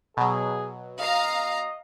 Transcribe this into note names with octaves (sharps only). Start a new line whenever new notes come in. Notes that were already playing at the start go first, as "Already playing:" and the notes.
B2 F#3 G#4
D#5 F5 A#5